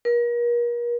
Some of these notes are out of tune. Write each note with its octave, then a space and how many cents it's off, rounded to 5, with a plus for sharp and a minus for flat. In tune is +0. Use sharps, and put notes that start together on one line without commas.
A#4 +40